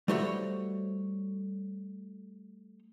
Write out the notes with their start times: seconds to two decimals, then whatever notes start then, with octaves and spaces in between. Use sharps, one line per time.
0.08 G3 A3 F#4 C5 C#5 F#5